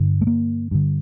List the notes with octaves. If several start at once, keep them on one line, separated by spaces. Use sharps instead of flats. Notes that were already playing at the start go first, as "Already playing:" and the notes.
Already playing: G2 D3
A3
A#3
G2 D3